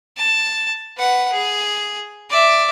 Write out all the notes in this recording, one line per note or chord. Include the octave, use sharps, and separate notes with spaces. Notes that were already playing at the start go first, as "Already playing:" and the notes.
A5
B4 F#5
G#4
D5 E5